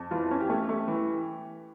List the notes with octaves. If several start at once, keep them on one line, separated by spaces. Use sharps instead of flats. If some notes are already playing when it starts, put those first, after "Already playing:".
Already playing: F2
E3 F4
C#4
G4
A3
A3
E3